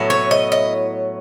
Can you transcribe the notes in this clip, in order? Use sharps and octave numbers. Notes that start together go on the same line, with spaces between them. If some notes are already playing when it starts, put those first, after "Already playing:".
Already playing: A2 F#3 B3
C#5
D#5
D#5